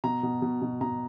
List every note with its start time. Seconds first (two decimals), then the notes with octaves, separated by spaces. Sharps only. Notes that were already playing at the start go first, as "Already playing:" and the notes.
0.04 B2 A#5
0.23 B2
0.42 B2
0.62 B2
0.81 B2 A#5